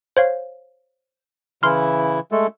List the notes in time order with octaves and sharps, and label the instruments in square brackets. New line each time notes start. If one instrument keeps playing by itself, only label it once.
[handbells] C5 C#5 F5
[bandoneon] C#3 E3 E4 [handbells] C6 F6
[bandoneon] G#3 A3 A4